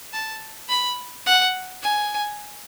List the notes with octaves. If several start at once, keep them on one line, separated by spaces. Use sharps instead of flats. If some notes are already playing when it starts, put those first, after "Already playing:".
A5
B5
F#5
G#5